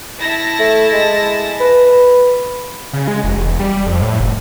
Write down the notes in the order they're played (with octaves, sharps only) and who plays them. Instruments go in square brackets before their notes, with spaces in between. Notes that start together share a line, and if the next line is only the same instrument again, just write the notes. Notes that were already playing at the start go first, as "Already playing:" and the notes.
[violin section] E4 A5 A#6
[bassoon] A3
G#3
B4
[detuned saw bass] C#3
G#3
F1
E1
G3
F2
A2
F1